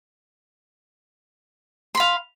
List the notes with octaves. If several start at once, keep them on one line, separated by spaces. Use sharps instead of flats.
F5 B5 C6